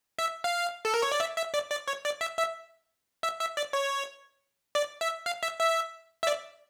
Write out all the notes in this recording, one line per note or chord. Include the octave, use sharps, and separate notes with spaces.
E5
F5
A4
A#4
C#5
D5
E5
E5
D5
D5
C#5
D5
E5
E5
E5
E5
D5
C#5
D5
E5
F5
E5
E5
E5
D5